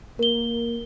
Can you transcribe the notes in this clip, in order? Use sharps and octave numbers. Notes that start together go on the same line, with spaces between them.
A#3 A#4 G7